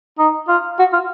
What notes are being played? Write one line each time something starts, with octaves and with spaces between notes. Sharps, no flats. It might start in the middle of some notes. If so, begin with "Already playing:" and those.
D#4
F4
F#4
F4